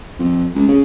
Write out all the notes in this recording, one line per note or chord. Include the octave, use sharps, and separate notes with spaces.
F2
C#2
C#3